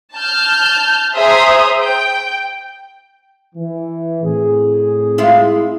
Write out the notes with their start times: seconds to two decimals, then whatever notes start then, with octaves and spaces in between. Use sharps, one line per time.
0.16 A5 F6 G6
1.14 G#4 C5 E5 A#5 D#6
1.81 G5
3.55 E3
4.23 A2 C4 G#4
5.18 G#3 E4 F4